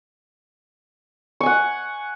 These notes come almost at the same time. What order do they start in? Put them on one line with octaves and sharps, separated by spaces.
C#6 G#5 F#5